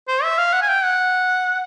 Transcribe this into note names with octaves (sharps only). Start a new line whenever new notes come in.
C5
E5
F5
F#5
G#5
G5
F#5